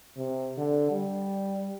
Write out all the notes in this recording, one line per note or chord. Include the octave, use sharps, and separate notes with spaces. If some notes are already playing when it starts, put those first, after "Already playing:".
C3
D3
G3